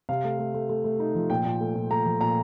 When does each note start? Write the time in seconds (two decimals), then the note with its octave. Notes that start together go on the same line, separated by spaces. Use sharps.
0.09 C3 F5
0.24 A3
0.39 A3
0.54 A3
0.69 A3
0.84 A3
1.00 D#4
1.15 F3
1.30 A#2 G5
1.45 A#2
1.60 A3
1.75 A#2
1.90 A3 A#5
2.06 F3
2.21 A#2 A#5